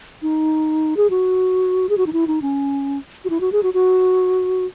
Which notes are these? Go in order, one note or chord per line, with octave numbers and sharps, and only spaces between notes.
D#4
G#4
F#4
G#4
F#4
D#4
E4
D#4
C#4
F#4
E4
F#4
G#4
F#4
F#4